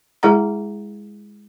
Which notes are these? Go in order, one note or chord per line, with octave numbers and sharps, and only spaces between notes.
G#3 E4 G#4 F#5 A#5